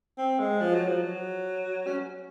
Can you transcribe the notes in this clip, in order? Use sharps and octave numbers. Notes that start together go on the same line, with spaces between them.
C4
G#3
F3
F#3
F3
F#3
C#4